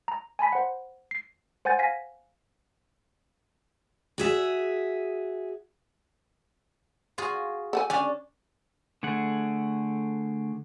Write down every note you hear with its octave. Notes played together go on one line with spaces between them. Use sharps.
A#5
G#5 A5 B5 B6
C5 F#5
C7
C5 F#5 G#5 G6 A6
F5 G#5 A#6 B6
F#4 G#4 E5
F4 F#4 G#4
A4 F#5 G#5
C#4 D4 G#5
D3 A3 G#4 F#5